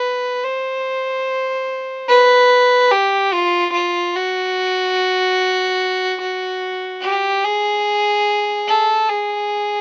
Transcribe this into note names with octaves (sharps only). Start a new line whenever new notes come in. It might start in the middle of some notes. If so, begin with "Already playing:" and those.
Already playing: B4
C5
B4
G4
F4
F4
F#4
F#4
G4
G#4
A4
G#4